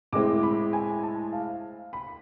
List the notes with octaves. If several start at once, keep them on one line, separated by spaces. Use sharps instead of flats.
A2 G#3 C4 E4 D6
B5
G#5
A5
F5
B5